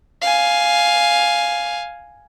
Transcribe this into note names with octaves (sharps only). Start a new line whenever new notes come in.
F5 G#5